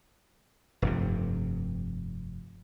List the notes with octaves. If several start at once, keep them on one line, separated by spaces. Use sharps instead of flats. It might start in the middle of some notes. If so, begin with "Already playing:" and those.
F1 G2 C3